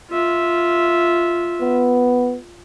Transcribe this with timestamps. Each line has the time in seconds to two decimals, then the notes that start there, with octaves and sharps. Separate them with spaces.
0.10 F4 E5
1.62 B3